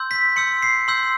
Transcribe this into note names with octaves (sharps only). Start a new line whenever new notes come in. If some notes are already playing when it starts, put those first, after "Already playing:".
Already playing: C6 E6 G6
B6
C6 E6 G6 C#7
C7
C6 E6 G6